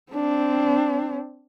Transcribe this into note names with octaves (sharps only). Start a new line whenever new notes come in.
C4 D4